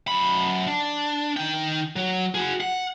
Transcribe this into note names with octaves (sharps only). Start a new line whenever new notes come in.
F#2 B5
D4
D#3 G5
F#3
F#4 G#4
F#5